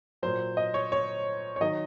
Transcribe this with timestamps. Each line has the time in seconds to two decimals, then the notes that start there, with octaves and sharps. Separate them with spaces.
0.23 A#2 F#3 C5
0.57 D#5
0.74 C#5
0.92 C#5
1.56 C#5
1.61 D#3 F#3 D#5